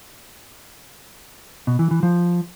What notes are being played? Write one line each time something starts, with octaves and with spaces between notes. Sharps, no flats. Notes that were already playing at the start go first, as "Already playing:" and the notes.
B2
E3
E3
F3